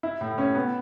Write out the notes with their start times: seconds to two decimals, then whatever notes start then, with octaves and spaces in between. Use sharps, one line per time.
0.03 E4
0.21 A2
0.38 C#4
0.55 B3